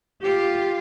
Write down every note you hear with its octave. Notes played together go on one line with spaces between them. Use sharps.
F4 G4